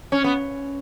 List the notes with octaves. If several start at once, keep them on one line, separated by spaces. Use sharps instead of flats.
C#4
B3